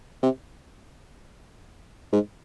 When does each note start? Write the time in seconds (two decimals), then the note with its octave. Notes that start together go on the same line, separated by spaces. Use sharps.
0.23 C3
2.13 G#2